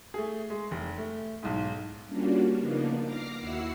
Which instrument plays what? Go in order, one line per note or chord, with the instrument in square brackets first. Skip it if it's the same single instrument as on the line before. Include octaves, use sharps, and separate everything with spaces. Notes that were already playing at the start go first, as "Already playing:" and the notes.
[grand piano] A3 G#4
G#3
F1
A3
B1 G#2
[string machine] G3 A#3 C#4 D4 F4 F#4
C#3 F3 A#3 B3 D4 D#4
D6 F6 A#6 C7
D#2 E4 F#4 F#5 E6 C7